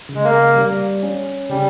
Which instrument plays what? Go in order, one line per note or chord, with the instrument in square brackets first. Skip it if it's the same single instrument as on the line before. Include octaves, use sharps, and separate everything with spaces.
[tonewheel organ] C#3
[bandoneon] G#3
A#3
[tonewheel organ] G3
C#4
[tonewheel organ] C#3 [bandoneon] G3